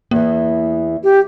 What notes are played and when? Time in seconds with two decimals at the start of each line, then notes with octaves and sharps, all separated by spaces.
0.11 E2 E3 A#3
1.04 G4